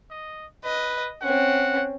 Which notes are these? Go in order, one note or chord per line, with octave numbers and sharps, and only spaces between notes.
D#5
B4 D#5
C4 C#4 F#5